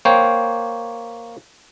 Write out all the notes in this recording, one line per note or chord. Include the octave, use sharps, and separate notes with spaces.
A#3 C5 C#5 G5